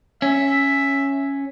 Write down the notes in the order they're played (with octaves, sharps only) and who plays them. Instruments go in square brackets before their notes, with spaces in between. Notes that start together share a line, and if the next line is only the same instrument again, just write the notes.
[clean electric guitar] C#4 [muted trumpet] E5